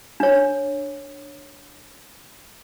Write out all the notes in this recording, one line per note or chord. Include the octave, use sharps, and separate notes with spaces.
D4 C#5